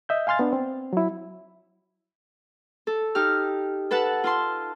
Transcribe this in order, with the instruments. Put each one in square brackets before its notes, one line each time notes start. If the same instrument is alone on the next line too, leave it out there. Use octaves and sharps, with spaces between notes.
[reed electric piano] D#5 E5 G6
F5 G#5 C6 F6 A6
B3 D4
C4
F#3 E4
[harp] A4
D#4 G4 F6
A4 B4 F#5 A5
F4 A5 C6